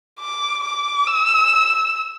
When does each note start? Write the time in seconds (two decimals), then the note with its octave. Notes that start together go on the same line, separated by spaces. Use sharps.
0.20 D6
0.64 D6
1.07 E6